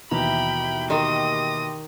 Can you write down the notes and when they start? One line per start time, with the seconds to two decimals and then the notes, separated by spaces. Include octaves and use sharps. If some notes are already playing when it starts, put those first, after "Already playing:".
0.11 D#2 B2 E3 E5 G5 A#5 B5
0.90 D#3 G4 G5 C6 D#6 A#6